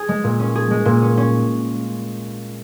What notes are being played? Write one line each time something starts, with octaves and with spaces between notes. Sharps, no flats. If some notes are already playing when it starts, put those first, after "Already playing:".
Already playing: G#4
G#3
A#2
C#4
G#4
G#3
A#2
C#4
C#4